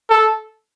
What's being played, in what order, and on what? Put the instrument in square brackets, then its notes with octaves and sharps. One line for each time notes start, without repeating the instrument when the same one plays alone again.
[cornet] A4